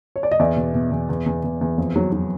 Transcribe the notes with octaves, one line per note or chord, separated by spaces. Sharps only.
C#5
D5
D#5
E2 D5 E5
B2
B2
E2
E2
E2
E2
E2
F2
F#3
F#3